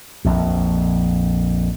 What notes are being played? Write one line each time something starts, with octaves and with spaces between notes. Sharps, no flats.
A#1 F2